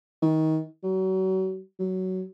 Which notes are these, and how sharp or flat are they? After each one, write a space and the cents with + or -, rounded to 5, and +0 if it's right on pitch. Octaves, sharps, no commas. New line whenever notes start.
D#3 +25
F#3 +35
F#3 +15